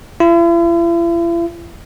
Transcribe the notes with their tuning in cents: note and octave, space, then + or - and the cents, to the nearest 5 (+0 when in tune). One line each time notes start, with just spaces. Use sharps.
E4 +45